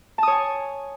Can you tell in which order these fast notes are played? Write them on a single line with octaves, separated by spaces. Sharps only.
A5 D#6 C#5 G#5